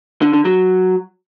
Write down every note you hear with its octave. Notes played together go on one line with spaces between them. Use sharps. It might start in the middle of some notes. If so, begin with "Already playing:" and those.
D3
D3
F#3